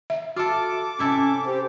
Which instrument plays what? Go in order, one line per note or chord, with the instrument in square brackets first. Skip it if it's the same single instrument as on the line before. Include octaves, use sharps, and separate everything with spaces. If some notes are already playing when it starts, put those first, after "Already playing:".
[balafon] E5
[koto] F4 A4 [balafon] F#4 [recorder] D6
[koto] C3 E4 A4 [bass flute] C#4
[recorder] G4 [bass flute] C5